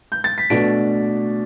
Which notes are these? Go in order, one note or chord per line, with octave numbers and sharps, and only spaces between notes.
G6
A6
B6
B2 A3 D4 D7